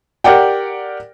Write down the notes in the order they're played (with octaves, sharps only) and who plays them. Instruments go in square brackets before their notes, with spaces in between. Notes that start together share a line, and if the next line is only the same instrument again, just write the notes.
[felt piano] G4 A#4 D5 F#5 G5